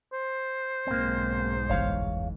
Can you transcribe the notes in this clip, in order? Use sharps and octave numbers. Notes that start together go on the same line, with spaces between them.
C5
B1 G#2 A#3 C4
G1 E2 C#5 F5